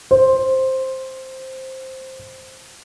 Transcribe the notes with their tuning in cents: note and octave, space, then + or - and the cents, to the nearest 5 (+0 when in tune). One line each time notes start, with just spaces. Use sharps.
C5 +5